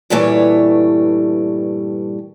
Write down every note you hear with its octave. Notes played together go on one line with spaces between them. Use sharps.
G2 A#2 E3 G3 A3 C#5